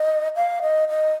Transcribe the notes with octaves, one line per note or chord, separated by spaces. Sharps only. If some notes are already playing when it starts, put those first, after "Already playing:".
Already playing: D#5
F5
D#5
D#5